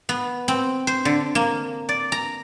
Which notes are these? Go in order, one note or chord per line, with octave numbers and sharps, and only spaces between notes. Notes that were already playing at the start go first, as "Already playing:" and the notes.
B3
C4
C5
D3
A#3
D5
A#5